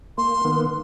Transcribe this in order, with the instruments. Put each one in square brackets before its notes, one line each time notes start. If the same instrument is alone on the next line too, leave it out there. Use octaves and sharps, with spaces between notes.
[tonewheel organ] A#3 [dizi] C6
[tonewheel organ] D#3 A#3 B3